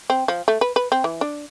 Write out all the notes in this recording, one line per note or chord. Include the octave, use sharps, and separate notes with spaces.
C4
F3
A3
B4
B4
C4
E3
D4